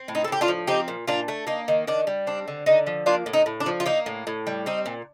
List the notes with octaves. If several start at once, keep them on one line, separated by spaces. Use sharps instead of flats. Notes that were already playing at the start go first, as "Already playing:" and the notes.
Already playing: C4
A2
D#4
A4
A2 G4
D4 F4
F3
C4 D#4 G4
A#2
A#2 D4 F4
A3
A#3 D#4
D#3
D#3 D4
G3
C4 D4
D3
D3 D#4
F3
A#3 D4 F4
A2
D#4
A2
D4
F3
F4
A#3 D#4
A2
A2
G3
C4 D#4
A#2